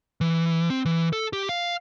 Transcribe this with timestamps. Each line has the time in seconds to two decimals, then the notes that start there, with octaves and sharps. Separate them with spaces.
0.21 E3
0.70 C4
0.85 E3
1.13 A4
1.33 G4
1.49 F5